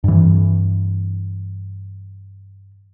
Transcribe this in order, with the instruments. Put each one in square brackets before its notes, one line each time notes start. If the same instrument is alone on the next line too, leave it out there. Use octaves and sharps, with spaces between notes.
[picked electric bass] G2 E3